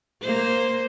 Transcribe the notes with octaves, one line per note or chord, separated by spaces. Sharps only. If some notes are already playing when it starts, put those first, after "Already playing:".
A#3 C5